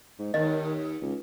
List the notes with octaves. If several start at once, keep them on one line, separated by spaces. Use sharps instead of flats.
G#2
D#2 D#3 D#5
C#2